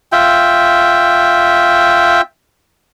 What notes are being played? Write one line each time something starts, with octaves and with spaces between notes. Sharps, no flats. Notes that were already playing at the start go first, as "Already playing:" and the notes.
F4 E5 G5